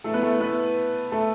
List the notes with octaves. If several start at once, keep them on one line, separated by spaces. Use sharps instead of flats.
A2 E3 A3 A4
B3 B4
A3 A4
B3 B4
A3 A4